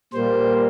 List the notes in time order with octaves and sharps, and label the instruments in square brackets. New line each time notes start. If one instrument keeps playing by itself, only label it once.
[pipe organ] A#2 G3 A#3 C5